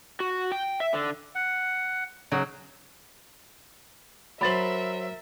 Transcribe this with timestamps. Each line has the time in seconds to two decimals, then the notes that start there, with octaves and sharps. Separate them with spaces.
0.20 F#4
0.52 G5
0.80 E5
0.93 D3
1.35 F#5
2.32 C#3 F#3
4.41 F#3 A#4 C5 E5 B5 A6 F#7